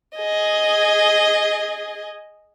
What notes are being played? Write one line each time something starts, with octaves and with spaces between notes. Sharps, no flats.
G#4 D#5